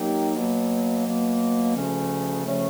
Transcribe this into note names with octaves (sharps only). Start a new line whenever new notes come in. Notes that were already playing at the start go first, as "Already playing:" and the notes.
Already playing: D#3 F#3 A#3 D#4 G4
B2 F#3 A#3
B2 F#3 A#3
D2 C#3 F3 A3 C#4
D2 C#3 F3 A3 C#4